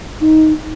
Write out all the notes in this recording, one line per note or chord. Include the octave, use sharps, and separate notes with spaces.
D#4